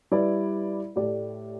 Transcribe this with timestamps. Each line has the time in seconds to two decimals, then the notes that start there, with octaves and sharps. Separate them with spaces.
0.11 G3 E4 B4 D5
0.96 A2 A3 G4 D5